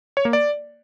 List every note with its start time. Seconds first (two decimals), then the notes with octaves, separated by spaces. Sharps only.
0.17 C#5
0.25 A#3
0.33 D5